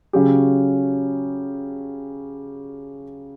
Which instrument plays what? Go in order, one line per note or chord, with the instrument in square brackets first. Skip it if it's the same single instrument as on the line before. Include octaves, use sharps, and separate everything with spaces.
[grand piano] C#3 F#3 C#4 G4